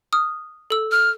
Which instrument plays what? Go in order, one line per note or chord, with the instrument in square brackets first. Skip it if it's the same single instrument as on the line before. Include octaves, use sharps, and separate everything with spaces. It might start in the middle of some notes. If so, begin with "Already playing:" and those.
[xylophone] D#6 F6
A4 E6
[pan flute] F6